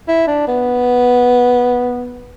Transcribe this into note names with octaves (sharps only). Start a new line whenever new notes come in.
E4
D4
B3